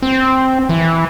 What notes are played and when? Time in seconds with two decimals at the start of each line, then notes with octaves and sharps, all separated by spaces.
0.02 C4
0.69 E3